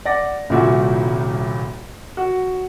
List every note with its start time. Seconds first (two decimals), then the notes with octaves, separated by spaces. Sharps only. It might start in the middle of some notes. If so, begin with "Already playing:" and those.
0.05 D5 F#5 A#6
0.50 D#1 C2 A#2 E4 F#4
2.17 F#4